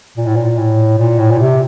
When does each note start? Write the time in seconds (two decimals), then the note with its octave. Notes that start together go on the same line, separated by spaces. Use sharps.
0.17 A#2
0.27 A2
0.36 A#2
0.58 A2
0.98 A#2
1.19 A2
1.31 A#2
1.39 C3